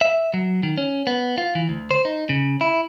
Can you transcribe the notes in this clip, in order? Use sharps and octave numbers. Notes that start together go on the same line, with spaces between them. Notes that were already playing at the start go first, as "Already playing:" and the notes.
E5
F#3
D#3
C#4
B3
F4
E3
D2
C5
D#4
C#3
E4